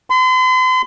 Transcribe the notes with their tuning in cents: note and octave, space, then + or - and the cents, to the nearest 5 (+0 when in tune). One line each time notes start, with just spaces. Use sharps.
C6 -45